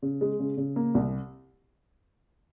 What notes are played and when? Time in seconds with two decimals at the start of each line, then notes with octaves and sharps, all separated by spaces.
0.02 C#3
0.21 G#3
0.39 C#3
0.57 C#3
0.76 A#3
0.95 C2